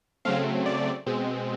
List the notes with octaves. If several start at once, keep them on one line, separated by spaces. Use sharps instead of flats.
C#3 F#3 A3 C4 F5
D5
B2 G#3 C4